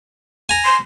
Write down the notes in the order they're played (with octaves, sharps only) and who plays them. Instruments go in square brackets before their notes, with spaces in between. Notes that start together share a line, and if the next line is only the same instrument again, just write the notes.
[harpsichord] G#5 A#5
[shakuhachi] C6